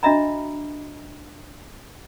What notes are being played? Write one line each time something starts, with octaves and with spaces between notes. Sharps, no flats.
D4 F#4 D#5 E5 A#5 B5